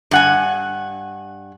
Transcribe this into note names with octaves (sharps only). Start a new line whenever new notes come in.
G2 F#5 G#5